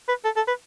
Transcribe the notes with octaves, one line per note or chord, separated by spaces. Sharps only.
B4
A4
A4
B4